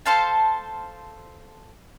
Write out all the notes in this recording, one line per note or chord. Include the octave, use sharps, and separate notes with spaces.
A4 C5 F5 A5